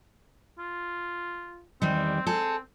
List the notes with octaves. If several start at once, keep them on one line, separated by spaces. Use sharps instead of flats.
F4
E2 D#3 G3 C4
C4 G#4 A4